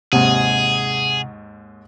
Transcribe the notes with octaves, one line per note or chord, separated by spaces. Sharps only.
D#2 G#2 C3 G#4 F#5